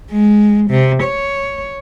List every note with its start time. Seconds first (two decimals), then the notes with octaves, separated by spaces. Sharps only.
0.12 G#3
0.70 C3
1.03 C#5